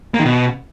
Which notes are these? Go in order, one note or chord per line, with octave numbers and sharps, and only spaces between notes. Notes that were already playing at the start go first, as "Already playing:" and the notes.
A#3
D#3
B2